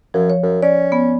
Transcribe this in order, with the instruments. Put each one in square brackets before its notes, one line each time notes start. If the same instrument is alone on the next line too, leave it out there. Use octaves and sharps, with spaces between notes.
[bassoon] F#2 [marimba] F3
[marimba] C#5
[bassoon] F#2
[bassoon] C#4 [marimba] D5
[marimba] B3